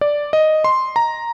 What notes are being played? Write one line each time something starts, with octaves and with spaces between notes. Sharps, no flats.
D5
D#5
C6
A#5